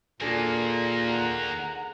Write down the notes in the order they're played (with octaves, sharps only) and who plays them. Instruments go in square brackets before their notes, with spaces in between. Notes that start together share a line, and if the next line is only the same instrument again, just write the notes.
[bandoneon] A#2 [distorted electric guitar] D#3 A#3 [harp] D4 G#4 A4
[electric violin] F#5 A#5